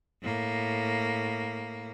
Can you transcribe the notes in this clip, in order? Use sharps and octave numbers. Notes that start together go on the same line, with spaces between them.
A2 A#3